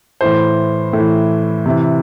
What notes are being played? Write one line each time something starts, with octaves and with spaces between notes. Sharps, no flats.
A2 E3 C5
A2
E3
C3 E3